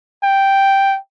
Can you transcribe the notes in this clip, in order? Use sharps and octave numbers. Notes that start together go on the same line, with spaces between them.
G5